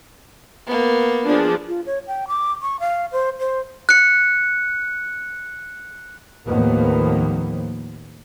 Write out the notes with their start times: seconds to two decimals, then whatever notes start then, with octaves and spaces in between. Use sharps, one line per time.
0.67 A#3 B3
1.26 F3 D4 G#4
1.68 F4
1.86 C#5
2.07 G5
2.28 D6
2.62 C#6
2.80 F5
3.12 C5
3.40 C5
3.89 F#6 C#7
6.46 D#2 A2 D#3 F3 A#3 B3